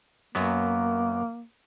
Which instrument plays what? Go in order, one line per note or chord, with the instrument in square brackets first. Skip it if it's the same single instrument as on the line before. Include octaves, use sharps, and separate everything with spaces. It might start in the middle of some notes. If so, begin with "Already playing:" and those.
[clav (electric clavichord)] F#2 F#3 B3 [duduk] A#3